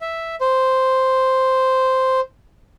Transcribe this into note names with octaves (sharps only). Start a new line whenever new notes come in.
E5
C5